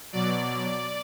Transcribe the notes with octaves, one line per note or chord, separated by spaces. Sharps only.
B2 F#3 D5